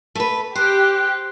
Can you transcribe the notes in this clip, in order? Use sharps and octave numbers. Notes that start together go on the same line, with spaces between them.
A3 B4
G4 C5 F#6